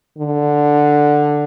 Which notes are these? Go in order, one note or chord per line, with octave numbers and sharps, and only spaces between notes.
D3